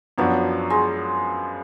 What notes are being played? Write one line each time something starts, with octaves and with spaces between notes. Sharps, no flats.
F#2 F3 F#3 B3 D4
G#3